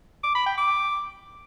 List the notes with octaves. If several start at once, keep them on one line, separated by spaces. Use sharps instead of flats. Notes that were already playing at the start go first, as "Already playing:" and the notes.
D6
B5
G5
D6